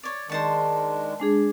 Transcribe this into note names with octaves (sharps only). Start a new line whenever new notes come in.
C#5 D5
D#3 G#3 D4 C5 A5 C#6
G#3 D4 G#4